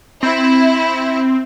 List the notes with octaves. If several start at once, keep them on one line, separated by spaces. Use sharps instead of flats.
C4 E4